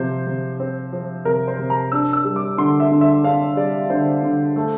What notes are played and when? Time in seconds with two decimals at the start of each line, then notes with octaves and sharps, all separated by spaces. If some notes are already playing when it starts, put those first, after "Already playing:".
Already playing: C3 F3 C5
0.27 C3
0.59 C4
0.93 F3
1.25 C3 A#4
1.48 C5
1.59 C3
1.70 A#5
1.92 D4 E6
2.13 E6
2.25 G3
2.36 D6
2.58 D3 C6
2.80 E5
2.91 D3
3.01 E5
3.24 D4 F5
3.56 G3 D5
3.90 D3 C5
4.23 D3
4.56 A3